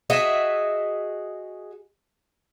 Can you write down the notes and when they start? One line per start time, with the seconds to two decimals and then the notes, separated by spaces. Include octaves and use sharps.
0.10 F#4 G#4 D#5 E5